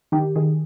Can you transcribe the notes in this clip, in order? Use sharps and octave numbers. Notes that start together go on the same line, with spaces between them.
D#3 G4
D#3 G#4